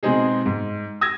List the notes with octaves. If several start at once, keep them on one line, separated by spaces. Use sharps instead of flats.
B2 G#3 C4 D#4 G#4
G#2
D#6 E6 G#6 A#6